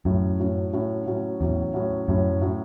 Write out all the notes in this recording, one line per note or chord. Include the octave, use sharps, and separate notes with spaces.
F#2 A2 F#3 C#4 F#4
A2 F#3 C#4 F#4
A2 F#3 C#4 F#4
A2 F#3 C#4 F#4
E2 A2 F#3 C#4
A2 F#3 C#4
F#2 A2 F#3 C#4
A2 F#3 C#4